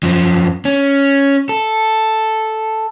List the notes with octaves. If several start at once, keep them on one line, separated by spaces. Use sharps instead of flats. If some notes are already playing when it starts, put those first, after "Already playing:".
F#2 F3
C#4
A4